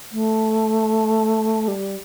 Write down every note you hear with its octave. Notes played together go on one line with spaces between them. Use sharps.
A3
G3